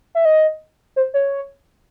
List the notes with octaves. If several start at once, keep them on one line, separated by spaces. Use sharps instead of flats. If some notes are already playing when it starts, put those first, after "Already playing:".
E5
D#5
C5
C#5